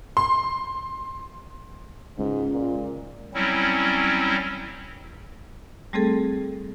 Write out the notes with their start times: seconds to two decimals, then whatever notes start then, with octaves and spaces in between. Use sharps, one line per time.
0.17 C6
2.18 C#2 G#2
2.52 A#2
3.34 F#3 G3 C4 C#4 E4
5.93 G3 A3 C4 G#4 A4